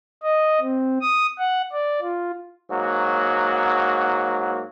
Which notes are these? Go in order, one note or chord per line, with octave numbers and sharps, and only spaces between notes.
D#5
C4
D#6
F#5
D5
F4
G#2 F#3 A#3 F#4